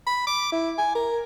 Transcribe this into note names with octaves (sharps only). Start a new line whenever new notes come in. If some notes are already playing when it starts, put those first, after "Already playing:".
B5
D6
E4
G#5
A#4